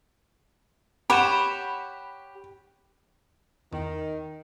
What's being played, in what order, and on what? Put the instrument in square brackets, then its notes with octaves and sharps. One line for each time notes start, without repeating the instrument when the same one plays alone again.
[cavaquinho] G4 C#5 F#5 [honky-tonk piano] B5 E7
[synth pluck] E2 [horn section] D#3